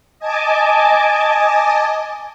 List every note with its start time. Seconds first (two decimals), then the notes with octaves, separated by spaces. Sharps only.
0.19 D#5 G#5 A5 D6